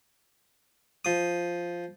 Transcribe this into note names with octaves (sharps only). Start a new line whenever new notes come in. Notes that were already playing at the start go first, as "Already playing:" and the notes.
F3 D#6